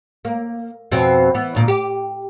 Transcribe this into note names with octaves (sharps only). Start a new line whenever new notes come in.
A#3
F2 B2 C4
E3 B3
D2 A#2
G4